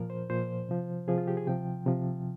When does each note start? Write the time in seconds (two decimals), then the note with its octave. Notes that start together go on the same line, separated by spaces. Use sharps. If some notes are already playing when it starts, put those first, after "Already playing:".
Already playing: A#2 F3 A#4
0.10 C5
0.29 A#2 F3 C5
0.68 C3 F3
1.07 C3 F3 G#4
1.18 F4
1.28 G4
1.37 G#4
1.47 C3 F3 G5
1.86 C3 F3